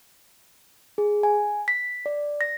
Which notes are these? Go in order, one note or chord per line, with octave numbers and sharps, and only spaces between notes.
G#4
G#5
B6
D5
A#6